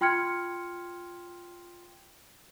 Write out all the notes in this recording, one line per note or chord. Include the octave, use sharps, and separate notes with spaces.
F4 G5 C6 F6 G#6 C#7